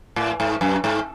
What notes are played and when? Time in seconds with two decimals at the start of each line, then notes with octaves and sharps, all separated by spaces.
0.16 A2
0.40 G#2
0.61 F#2
0.84 G#2